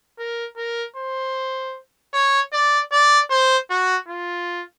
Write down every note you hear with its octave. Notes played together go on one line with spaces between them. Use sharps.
A#4
A#4
C5
C#5
D5
D5
C5
F#4
F4